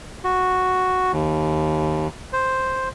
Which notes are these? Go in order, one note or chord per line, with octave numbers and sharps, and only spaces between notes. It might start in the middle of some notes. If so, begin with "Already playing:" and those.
F#4
D#2
C5